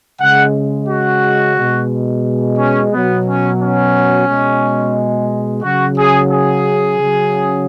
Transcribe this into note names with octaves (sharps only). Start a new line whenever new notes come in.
C#3 G#3 F#5
F#4
B2 G#3
C#4
B2 F#3 B3
C#4
C#4
B2 G#3
C#3 F#3 F#4
G#4
G#4
C#3 F#3